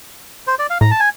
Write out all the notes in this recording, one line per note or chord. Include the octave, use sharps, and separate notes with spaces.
C5
D5
F5
A2 A#5
A5
G#5